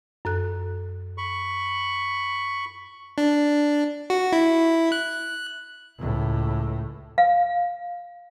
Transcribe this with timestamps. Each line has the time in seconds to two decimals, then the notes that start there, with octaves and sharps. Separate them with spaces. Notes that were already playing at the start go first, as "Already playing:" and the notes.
0.25 F#2 A4 F#6
1.18 B5 C#6
3.18 D4
4.10 F#4
4.32 E4
4.92 F#6
5.98 C#2 A2
7.18 F5